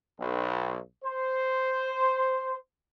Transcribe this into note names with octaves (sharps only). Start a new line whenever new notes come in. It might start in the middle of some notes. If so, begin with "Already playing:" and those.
B1
C5